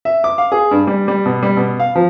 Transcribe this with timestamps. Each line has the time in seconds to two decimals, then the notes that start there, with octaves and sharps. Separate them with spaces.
0.05 E5
0.24 D6
0.38 F5
0.52 G#4
0.71 G2
0.87 G3
1.08 G3
1.26 B2
1.43 G3
1.57 B2
1.80 F5
1.95 F3